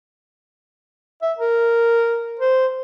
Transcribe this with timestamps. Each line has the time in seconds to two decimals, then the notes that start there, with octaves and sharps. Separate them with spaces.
1.22 E5
1.38 A#4
2.39 C5